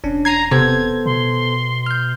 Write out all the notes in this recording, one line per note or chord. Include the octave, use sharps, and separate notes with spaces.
E1 C#4 D4
A#5 G#6 C7 D#7
C3 B3 A4 C5 G#6
B2 C6
F6 G6